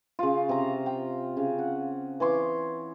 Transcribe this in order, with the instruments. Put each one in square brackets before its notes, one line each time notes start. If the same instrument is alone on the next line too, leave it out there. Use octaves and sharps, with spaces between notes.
[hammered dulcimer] C#3 F4
C3 A#5
G5
C#3
F#5
E3 C#5 C6 D6